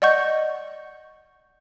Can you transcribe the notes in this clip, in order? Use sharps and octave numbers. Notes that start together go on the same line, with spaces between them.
D5 D#5 F#5 C#6 G6